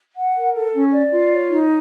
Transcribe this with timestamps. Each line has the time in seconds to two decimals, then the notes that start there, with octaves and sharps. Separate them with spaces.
0.16 F#5
0.35 A#4
0.55 A4
0.73 C#4
0.93 D5
1.12 F4
1.31 C#5
1.50 D#4